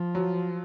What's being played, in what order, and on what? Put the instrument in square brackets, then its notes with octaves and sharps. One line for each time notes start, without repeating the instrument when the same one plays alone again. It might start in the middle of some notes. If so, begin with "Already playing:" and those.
Already playing: [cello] F3
[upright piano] F#3